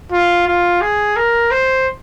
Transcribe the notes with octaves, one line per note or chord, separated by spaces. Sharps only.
F4
F4
G#4
A#4
C5